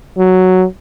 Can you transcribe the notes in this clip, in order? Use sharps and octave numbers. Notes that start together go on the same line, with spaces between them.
F#3